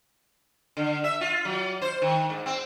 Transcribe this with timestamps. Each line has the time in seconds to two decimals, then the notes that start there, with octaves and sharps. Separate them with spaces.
0.77 D3
1.04 E5
1.21 F4
1.45 F#3
1.82 C5
2.02 D#3
2.30 G#2
2.46 C4